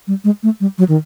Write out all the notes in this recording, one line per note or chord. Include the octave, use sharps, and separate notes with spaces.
G3
G#3
A3
G3
F#3
D#3